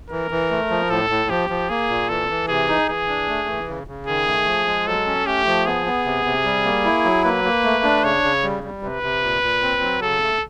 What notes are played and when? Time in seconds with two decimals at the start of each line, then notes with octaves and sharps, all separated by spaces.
0.10 E3 A#4
0.31 E3
0.50 A3
0.70 F3
0.90 A2 A4
1.10 A2
1.30 F3 G4
1.50 F3
1.69 A#3 G#4
1.89 A#2
2.09 E3 A4
2.29 E3
2.48 C3 G#4
2.68 D#4
2.88 E3 G#4
3.08 D4
3.28 A3
3.48 E3
3.68 C#3
3.87 C#3
4.07 D#3 G#4
4.27 A3
4.47 F3
4.66 G#3
4.87 F#3 A4
5.07 C#4
5.26 A3 G4
5.46 F3
5.66 B3 G#4
5.86 B3
6.05 C3
6.25 C3
6.45 G3
6.65 A#3
6.85 E4
7.04 F#3
7.24 A#3 B4
7.44 A#3
7.64 A3
7.84 D4
8.04 C#3 C#5
8.24 C#3
8.44 G3
8.64 G3
8.83 C3 B4
9.03 C3
9.23 A#2
9.43 A#2
9.62 C4
9.82 F#3
10.02 C#3 A4
10.22 A3